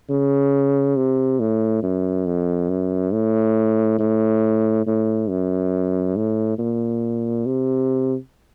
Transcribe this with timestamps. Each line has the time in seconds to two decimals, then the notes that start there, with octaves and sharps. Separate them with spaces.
0.09 C#3
0.96 C3
1.40 A2
1.83 F#2
2.26 F2
2.70 F#2
3.13 A2
3.99 A2
4.86 A2
5.29 F#2
6.16 A2
6.58 A#2
7.46 C3